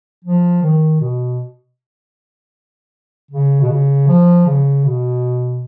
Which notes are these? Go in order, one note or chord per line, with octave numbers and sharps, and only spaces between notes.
F3
D#3
B2
C#3
B2
C#3
F3
C#3
B2